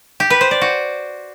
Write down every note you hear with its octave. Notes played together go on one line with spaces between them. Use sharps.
G4
B4
C5
D5
F#4